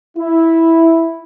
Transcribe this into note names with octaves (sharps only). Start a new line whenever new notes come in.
E4